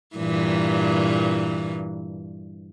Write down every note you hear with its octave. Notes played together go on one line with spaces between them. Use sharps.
G2 A#2 E3